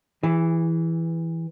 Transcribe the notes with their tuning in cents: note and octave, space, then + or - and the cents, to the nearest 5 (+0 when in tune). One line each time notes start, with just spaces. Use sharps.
E3 +0 G#4 -30